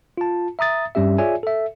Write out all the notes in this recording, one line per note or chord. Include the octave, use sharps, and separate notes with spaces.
F4 A5
E5 A#5 D#6 A6
G2 G3 C#4 G4 E5
F4 G#4 C#5 D5 E5 G#5
A4 E5